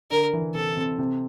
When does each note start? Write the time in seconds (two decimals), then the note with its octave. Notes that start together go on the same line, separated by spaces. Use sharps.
0.10 D3 D4 A#4
0.33 E3 E4
0.55 C3 C4 A4
0.77 C3 C4
0.99 C3 C4